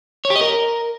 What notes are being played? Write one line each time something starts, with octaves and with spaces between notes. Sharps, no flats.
C#5
G4
D#5
A#4